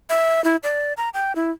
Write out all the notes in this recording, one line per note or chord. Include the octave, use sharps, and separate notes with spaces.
E5
E4
D5
A#5
G5
E4